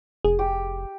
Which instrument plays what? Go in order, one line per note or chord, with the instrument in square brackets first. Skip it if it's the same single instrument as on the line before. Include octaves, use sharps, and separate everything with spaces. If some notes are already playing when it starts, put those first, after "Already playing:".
[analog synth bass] F1 [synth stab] G#4
[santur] G4